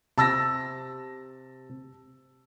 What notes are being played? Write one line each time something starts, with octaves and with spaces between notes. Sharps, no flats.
C3 A5 E6 A#6